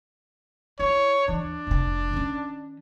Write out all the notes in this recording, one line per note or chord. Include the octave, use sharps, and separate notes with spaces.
E4 C#5
D#2 E3 D4
F1 C3
D#3 C#4